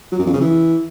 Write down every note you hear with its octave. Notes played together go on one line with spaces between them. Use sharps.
F#3
F#2
F2
C#3
E3